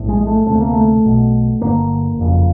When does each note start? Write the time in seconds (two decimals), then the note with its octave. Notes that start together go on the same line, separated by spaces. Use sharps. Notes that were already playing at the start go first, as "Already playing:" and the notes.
Already playing: A#1 A2
0.09 G#3
0.21 G#3
0.27 A3
0.46 D2 C3 A3
0.61 A#3
0.74 A3
1.04 B1 B2
1.61 G1 G2 D3 A#3
2.18 F#1 F2 C#3